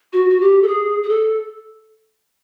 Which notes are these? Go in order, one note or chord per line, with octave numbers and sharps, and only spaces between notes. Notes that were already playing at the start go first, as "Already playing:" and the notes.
F#4
F#4
G4
A4
G#4
G#4
A4